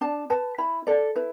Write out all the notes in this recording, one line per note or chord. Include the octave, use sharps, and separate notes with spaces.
D4 A5
B4 A5
E4 B5
A4 D5
E4 B4